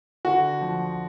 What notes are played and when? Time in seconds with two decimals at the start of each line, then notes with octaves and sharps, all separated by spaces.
0.25 D3 F#4
0.61 F3